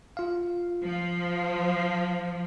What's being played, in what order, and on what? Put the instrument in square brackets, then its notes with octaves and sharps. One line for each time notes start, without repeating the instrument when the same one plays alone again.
[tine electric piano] F4 F5
[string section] F3